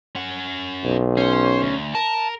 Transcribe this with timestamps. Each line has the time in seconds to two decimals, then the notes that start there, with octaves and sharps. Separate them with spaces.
0.15 C#4 F#5
0.84 B1
1.17 C#4 C5
1.62 D2
1.95 A#4 A5